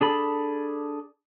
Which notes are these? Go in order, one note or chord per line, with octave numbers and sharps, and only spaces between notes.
D4 G#4 A4 B5